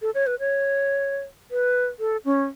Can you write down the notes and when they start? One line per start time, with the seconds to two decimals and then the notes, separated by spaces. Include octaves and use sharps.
0.02 A4
0.14 C#5
0.26 B4
0.39 C#5
1.51 B4
1.99 A4
2.25 C#4